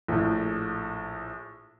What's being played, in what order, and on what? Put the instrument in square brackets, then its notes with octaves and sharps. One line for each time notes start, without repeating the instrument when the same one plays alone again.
[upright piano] A#1 A2